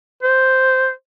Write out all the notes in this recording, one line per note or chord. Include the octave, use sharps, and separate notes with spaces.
C5